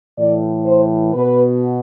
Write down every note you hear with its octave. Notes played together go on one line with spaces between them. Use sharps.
A2 E3 D5
C5
B2 B4